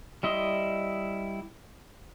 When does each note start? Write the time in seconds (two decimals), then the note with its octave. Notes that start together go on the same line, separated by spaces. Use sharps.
0.23 G3 E4 D#5 C6